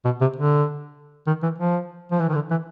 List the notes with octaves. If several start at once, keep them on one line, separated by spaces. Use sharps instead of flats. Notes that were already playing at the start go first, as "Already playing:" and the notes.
B2
C3
D3
D#3
E3
F3
F3
E3
D#3
D3
E3